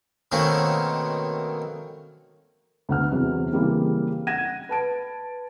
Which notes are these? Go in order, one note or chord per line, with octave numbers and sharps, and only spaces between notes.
B2 D#3 A3 A#3 C4 C#4
D2 B3 F#5 F6
E2 C3 E3 F#3
C#3 E3 G3 A#3 C4
F#5 G#6 A#6 D#7 E7
B4 A5 D7